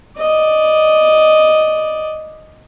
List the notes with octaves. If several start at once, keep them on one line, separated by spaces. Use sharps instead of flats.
D5 D#5